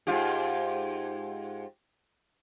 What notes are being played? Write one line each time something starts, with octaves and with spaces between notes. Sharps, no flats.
G#2 F4 G4